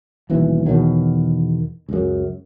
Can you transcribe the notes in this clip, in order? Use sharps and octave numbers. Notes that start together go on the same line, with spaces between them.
D#1 B1 E3
E2 B2 D#3 F#3
C#2 F#2